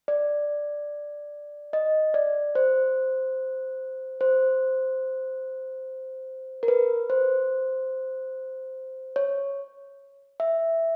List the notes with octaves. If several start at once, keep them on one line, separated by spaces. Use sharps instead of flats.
D5
D#5
D5
C5
C5
A#4
B4
C5
C#5
E5